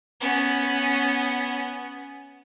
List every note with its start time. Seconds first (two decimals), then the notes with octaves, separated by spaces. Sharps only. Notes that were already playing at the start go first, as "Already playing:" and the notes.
0.20 B3 C#4